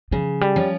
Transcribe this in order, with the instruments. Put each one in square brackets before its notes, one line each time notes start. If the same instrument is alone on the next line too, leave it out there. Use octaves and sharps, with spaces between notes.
[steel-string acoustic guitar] C#3 [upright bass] F3
[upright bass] G3
[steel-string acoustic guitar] F3 C#4